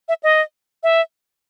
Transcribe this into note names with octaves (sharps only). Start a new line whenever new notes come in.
E5
D#5
E5